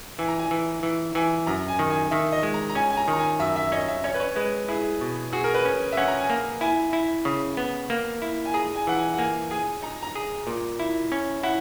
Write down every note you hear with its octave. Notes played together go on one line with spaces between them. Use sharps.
E3 G#5
A#5
G#5
E3
E3
E3 G#5
F#2 A#5
G#5
D#3
G#5
D#3 E5
D#5
G#3
A#5
A#5
C#4 G#5
G#5
A#5
D#3
A#5
G#5
F#2 E5
E5
C#4 D#5
E5
C#4 C#5
B4
C#5
G#3 B4
E4 G#4
B2
F#4 G#4
A#4
B4
C#4
E5
C#4 F#5
A#5
G#5
A#3
E4 G#5
E4
C#3
B3
A#3
E4
G#5
G#4 A#5
G#5
E3 F#5
G#5
F#5
A#3 G#5
G#4 G#5
D#4 A#5
A#5
G#4
A#2
E4
C#4
E4 F#5